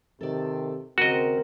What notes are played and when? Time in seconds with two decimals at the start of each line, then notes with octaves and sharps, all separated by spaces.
0.21 C3 D#3 A4 D5
0.98 D#2 C#3 C4 F#4 A#4 D#5